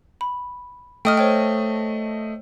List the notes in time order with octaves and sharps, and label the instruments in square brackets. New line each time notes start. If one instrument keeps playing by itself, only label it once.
[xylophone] B5
[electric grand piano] A3 D#5 [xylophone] G5 D#6 F6
[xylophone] C5 C#5 G5